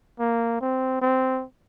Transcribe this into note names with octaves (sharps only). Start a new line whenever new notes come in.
A#3
C4
C4